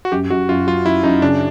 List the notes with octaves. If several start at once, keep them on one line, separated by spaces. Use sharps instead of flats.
F#4
F#2 G4
F#2 F#4
F#2 F4
F#3 F4
F#2 E4
F#2 D#4
C#3 D4